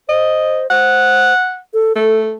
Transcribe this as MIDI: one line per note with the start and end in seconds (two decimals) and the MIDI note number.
0.09 0.67 72
0.09 0.62 75
0.70 1.33 72
0.70 1.58 78
1.74 1.93 69
1.96 2.35 57
1.96 2.23 69